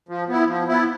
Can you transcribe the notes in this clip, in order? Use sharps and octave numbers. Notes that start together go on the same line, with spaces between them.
F3
B3 E4
F3
B3 E4